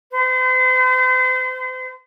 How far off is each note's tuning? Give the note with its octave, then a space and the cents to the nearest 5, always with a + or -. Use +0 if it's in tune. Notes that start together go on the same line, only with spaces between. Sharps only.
C5 -40